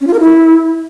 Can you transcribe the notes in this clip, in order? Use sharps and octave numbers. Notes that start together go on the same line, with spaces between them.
C#4
F4
A#4
E4